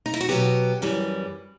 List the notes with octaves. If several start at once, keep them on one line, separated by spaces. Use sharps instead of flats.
D#4
E4
F#4
B2 F#3 B3 G4
F#2 E3 G3